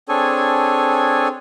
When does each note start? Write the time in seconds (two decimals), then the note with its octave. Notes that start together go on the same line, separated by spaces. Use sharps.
0.09 C4 D4 G#4 A4 C#5 G#5